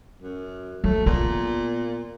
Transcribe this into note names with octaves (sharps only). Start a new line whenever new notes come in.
F#2
F#3 A3
A#2 B3